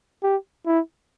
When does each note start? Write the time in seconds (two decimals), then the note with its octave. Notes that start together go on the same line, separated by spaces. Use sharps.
0.23 G4
0.66 E4